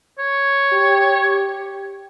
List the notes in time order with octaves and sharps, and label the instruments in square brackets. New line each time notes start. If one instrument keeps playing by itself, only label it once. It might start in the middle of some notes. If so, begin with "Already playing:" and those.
[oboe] C#5
[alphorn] G4